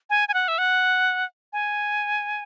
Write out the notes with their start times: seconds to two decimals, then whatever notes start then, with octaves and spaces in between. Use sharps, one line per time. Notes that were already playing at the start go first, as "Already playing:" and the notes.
0.10 G#5
0.28 G#5
0.34 F#5
0.48 E5
0.58 F#5
1.53 G#5